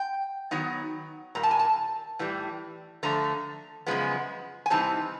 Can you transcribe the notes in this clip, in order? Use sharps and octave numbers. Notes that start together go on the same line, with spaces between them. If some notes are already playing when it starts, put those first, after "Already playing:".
Already playing: G5
D#3 F#3 B3 D#4
A#2 G3 A#3 A#5
A5
G#5
A5
A2 E3 G3
D3 F3 A3 A#5
F#2 C#3 F3 G#3 B3
G#5
C3 E3 G3 C4 D#4 A5